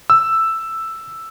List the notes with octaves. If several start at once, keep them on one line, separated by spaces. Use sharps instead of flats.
E6